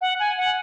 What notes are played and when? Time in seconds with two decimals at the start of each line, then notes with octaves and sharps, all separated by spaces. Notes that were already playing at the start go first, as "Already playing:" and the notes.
0.01 F#5
0.20 G#5
0.37 F#5